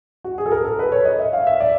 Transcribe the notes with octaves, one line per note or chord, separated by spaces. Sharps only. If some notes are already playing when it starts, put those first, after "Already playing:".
F#4
G#4
A4
A#4
A4
B4
C#5
D#5
E5
F5
E5
D5